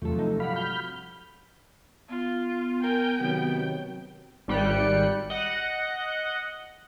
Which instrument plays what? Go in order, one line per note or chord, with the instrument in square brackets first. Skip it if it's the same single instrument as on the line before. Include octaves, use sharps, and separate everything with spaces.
[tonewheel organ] E2 [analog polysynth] C3 F3 F#3 [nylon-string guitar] A3 A4
[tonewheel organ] A3 [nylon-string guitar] D#4
[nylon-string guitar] G2 F#5 [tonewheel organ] F5 B5
[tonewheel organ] B5 F6 G6
[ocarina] B3 [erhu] F4
[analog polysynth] A#4 G#5 G6 [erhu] G5
[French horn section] C3 D#3 F#3 [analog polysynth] B3
[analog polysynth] G#1 G3 G5 F#6 C#7
D#5 F#5 F#6